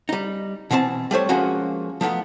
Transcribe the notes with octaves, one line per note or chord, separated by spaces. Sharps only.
G3 D#4
B2 E3 C4 C5 A5
G3 A3 C5 C#5
F3 G#3 A#3 C#4 F#4
F3 A3 B3 D#4